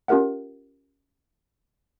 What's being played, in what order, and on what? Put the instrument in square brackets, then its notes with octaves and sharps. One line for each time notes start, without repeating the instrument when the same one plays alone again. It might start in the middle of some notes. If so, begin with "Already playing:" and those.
[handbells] C#4 F4 G4 A#4 E5 F#5